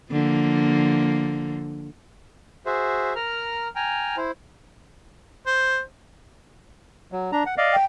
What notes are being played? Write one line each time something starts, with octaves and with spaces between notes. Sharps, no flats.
D3 F3 A#3
F#4 G#4 C5 E5
A#4 A#5 F6
G5 G#5 A#5 F6
E4 C5
C5
F#3
D4 A#5
F#5
D5 D#5 F5
G5